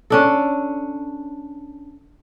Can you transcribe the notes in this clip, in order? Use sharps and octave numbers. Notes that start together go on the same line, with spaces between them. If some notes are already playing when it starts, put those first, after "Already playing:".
C#4 D4 A4